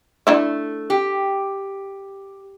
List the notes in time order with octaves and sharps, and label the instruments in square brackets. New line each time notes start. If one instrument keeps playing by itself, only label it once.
[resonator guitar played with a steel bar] A3 [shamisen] D4 E4 E5
[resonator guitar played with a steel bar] G4